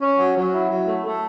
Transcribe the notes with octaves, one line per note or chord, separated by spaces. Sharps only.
C#4
F#3
F#3
E4
F#3
A3
A3